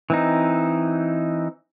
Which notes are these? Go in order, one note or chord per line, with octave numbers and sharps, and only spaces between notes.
E3 C4 D#4